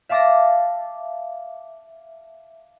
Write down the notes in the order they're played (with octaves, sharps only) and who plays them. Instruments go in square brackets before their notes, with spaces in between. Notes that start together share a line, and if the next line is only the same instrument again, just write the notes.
[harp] E5 F5 A5 D6 A6 A#6